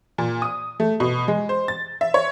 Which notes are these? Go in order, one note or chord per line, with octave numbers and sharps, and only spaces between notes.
A#2
D#6
A3
B2
G#3
C5
A6
E5
C#5